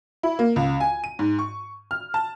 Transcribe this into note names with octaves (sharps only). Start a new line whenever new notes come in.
E4
A#3
C#2
G#5
D#7
G#2
C#6
F6
A5